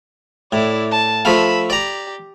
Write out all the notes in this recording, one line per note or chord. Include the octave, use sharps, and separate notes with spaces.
A2 E4 D5
A5
F3 A3 F5 B5 E6
G4 D5 A#5